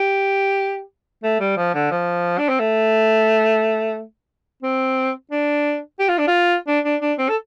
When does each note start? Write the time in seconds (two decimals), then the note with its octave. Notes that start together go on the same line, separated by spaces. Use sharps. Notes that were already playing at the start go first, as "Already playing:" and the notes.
Already playing: G4
1.23 A3
1.40 G3
1.57 F3
1.74 D3
1.91 F3
2.39 D4
2.49 C4
2.60 A3
4.63 C4
5.31 D4
5.99 G4
6.09 F4
6.18 D4
6.27 F4
6.68 D4
6.84 D4
7.01 D4
7.18 C4
7.29 A4